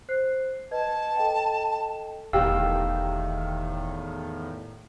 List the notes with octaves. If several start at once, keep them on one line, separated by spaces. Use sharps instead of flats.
C5 F#6 C7
B4 D#5 A5 G#6
A4 D#5 G5
E1 E2 A2 D#3 G4 F5 E6